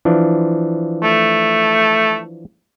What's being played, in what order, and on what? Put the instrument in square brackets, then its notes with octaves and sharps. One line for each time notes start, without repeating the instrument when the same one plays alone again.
[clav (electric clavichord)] E3 F3 D4
[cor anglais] A3